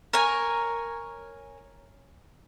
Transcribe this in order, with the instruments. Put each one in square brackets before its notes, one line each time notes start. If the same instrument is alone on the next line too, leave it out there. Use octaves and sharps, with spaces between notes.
[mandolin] A#4 C#5 G#5